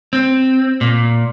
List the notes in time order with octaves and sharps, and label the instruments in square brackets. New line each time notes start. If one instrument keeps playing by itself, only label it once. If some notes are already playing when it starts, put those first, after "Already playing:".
[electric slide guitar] C4
A#2